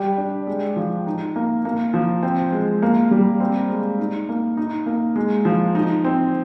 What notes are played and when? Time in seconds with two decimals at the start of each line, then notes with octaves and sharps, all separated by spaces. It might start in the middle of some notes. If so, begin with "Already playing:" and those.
Already playing: G3 G4
0.18 D4
0.47 G#3
0.76 F3
1.07 D#4
1.36 A#3
1.65 A#3
1.94 F3
2.23 C4
2.52 G#3
2.82 A#3
3.11 G3
3.40 C4
3.70 G#3
3.99 D#4
4.29 A#3
4.57 D#4
4.86 A#3
5.16 G#3
5.45 F3
5.75 D#4
6.04 C4